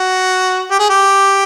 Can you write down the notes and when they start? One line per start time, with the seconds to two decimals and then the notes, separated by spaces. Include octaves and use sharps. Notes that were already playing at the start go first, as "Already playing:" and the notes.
Already playing: F#4
0.71 G4
0.79 G#4
0.90 G4